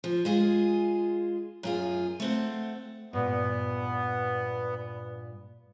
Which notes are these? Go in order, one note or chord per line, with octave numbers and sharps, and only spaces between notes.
F3
G#3 F4 G#4
F#2 F4 G#4
A3 C4 F#5
G2 A#2 B3